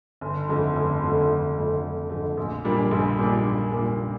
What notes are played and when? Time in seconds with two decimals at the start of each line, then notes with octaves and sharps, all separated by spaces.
0.21 G1
0.49 F2 D3 A3
0.76 G1
1.02 F2 D3 A3
1.30 G1
1.56 F2 D3 A3
1.83 G1
2.10 F2 D3 A3
2.37 A#1
2.64 A#2 G3 A#3 D4
2.91 A#1
3.18 A#2 G3 A#3 D4
3.45 A#1
3.71 A#2 G3 A#3 D4